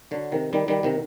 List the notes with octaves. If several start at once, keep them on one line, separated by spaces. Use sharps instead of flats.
D3 F#3
C3 D#3
D#3 G3
D#3 G3
C3 D#3